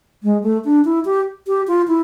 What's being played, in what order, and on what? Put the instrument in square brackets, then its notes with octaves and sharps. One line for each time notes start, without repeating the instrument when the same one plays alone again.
[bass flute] G#3
A3
D4
E4
G4
G4
F4
E4